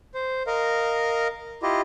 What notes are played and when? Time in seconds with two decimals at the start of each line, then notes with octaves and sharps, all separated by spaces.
0.14 C5
0.47 A#4 D#5 F5
1.63 E4 F4 G4 D#5